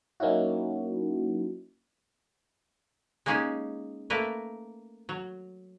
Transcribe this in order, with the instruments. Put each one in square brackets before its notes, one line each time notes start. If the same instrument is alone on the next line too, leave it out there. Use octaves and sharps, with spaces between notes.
[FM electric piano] F#3 A#3 C#4 D#4 E4 F#4
[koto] G#3 A#3 C#4 D#4 G4 G#4
A3 A#3 A#4 B4
F#3